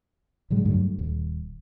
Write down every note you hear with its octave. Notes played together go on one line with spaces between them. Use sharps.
A2 D3 F#3 G#3
G2 F#3 A3
D#1